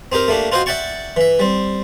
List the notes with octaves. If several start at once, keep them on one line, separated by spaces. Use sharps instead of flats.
C4 D#4 G4 A#4
A3 A#3 D4 G4
F4 F#4 C5 D#5 F5 G5
D5 E5 F#5 G5 A5 C#6
E3 E5
G3 C4